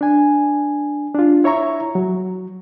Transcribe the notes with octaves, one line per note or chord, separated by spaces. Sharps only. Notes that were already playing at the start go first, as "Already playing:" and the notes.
D4 G#5
D4 F4
E4 C#5 E5 A#5 C#6
F#3